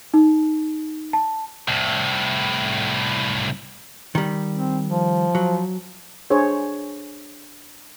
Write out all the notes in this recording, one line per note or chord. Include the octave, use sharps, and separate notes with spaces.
D#4
A5
C2 A2
D#3 G3
C4
F3
F#3
D4 G#4 C5 C#5